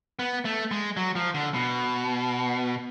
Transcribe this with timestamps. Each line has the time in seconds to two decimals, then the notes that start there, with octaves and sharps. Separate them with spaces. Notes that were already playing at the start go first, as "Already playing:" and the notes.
0.19 B3
0.45 A3
0.71 G#3
0.97 F#3
1.15 F3
1.34 D3
1.54 B2